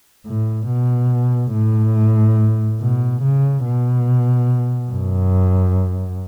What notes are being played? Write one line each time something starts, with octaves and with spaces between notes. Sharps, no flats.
A2
B2
A2
B2
C#3
B2
F#2